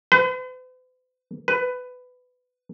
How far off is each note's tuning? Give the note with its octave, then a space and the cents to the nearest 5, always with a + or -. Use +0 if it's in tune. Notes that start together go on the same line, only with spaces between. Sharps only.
B4 +45
B4 +15